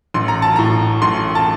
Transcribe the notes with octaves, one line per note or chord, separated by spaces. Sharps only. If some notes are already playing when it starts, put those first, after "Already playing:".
A1 C6
A#5
A5
A2 A#5
A1 C6
A5